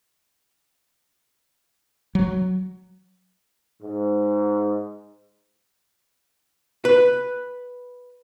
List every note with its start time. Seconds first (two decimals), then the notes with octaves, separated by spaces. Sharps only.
2.15 F#3
3.81 G#2
6.85 B4